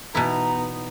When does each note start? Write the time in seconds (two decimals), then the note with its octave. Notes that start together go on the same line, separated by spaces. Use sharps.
0.15 B2 E3 B3 D#4 E4 A#5